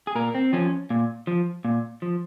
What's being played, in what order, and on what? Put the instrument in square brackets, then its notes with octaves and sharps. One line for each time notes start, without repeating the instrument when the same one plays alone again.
[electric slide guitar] G#4
A#2 A#4
C4
F3 C#4
A#2
F3
A#2
F3